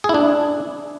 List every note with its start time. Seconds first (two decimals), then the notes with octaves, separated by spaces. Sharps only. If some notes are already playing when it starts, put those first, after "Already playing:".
0.04 G#4
0.09 E4
0.14 D4